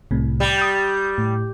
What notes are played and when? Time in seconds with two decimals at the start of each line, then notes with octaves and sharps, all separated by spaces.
0.11 C2 A2 C3
0.40 G3
0.58 D#6 G6
1.18 A2